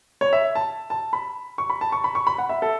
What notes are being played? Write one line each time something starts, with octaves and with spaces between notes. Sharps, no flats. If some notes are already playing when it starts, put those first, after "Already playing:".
C#5
E5
A5
A5
B5
C#6
B5
A5
C#6
B5
C#6
B5
F#5
E5
A4